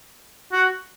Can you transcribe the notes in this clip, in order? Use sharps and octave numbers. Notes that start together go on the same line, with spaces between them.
F#4